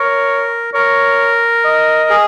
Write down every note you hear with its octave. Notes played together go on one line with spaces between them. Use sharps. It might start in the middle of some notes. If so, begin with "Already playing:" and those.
Already playing: A#4 C#5
A#4 C#5
D#5
G#4